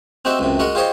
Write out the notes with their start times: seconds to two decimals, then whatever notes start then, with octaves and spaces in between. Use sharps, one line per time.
0.25 C4 D#4 F#4 G4 E5
0.39 C#2 F#2 C3
0.59 G#3 F#4 A#4 F#5
0.75 F4 G4 G#4 C5 C#5 D#5